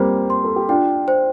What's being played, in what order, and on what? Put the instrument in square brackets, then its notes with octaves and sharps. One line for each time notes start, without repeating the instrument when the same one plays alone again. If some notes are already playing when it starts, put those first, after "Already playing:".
Already playing: [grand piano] G3 A#3 C4 [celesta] C5
[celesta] C6
[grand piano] A4
G4
[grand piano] D4 F4 [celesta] G5
[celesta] C5